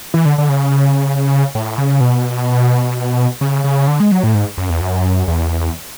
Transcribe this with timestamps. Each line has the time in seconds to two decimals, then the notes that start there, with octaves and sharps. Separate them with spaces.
0.14 E3
0.25 D3
0.38 D3
0.49 C#3
1.55 A2
1.78 C#3
2.01 B2
3.41 C#3
3.64 C#3
3.88 D3
4.00 G#3
4.12 F#3
4.23 A2
4.34 G#2
4.58 F#2
4.70 E2
4.81 F#2
5.28 E2